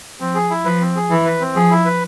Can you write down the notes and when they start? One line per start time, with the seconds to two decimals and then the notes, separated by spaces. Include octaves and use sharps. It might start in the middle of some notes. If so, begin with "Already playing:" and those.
0.20 F3 C4
0.35 G#4
0.50 E4
0.65 F3 B4
0.81 C4
0.96 G#4
1.10 E3 E4
1.25 B4
1.40 C4
1.56 F3 G#4
1.71 E4
1.86 B4